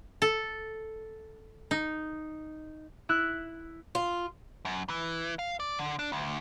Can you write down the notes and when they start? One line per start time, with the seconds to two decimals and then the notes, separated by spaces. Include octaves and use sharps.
0.22 A4
1.71 D#4
3.09 E4 E6 F#6
3.95 F4
4.65 F#2
4.90 E3
5.39 F5
5.60 D5
5.79 D3
5.99 D4
6.12 D2